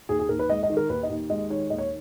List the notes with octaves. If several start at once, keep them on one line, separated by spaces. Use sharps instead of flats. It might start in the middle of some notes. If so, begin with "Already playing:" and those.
D#2 G#4
G#4
D#2 A#4
B4
G#3 D#5
D#5
D#3
A#4
D#2 B4
D#5
D#2
G#3 D#5
D#3 C#5
D#2 D#5
C#5